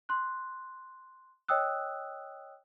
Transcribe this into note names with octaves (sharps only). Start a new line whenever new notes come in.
C6 F#6
C#5 D#5 G5 D#6 E6 F#6